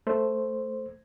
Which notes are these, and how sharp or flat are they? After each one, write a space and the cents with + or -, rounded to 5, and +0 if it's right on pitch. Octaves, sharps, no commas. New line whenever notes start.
A3 +0 C5 +0